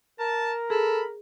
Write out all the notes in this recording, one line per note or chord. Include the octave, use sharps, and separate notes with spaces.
A#4 A5
G#4 A4 B5